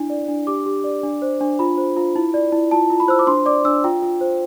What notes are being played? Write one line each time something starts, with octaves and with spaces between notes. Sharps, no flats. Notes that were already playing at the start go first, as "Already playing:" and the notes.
Already playing: D4 E4
D5
D4
G4 D6
G4
D5
D4
C5
D4
F4 B5
C5
F4
E4
D5
E4
F4 A5
F4
B5
C5 E6
D6
D4 C6
D5 D6
D4 E6
F4 G5
F4
C5